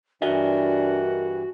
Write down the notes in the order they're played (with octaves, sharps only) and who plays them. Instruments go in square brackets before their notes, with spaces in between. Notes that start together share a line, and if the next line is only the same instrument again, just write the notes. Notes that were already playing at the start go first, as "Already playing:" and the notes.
[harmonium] G2 E3 [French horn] D4 [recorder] F#4 [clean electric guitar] A#4 D#5 E5